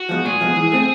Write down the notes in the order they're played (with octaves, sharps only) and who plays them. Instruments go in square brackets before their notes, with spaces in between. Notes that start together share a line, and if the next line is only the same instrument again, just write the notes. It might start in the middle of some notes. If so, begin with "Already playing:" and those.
Already playing: [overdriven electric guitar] F#4
[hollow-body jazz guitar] F3 G#3 B3
[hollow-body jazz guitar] A#2 [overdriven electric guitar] G#4
[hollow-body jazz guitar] F3 G#3 B3
E3
A3 C4